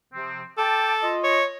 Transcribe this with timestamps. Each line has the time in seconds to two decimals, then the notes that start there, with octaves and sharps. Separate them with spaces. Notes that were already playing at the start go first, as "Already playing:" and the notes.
0.13 C3 F3 C4
0.58 A4 G5 A5 D6
1.02 F4 D#5
1.23 C#5